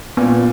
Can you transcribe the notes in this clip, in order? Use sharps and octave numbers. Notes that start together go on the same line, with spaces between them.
A#2 B3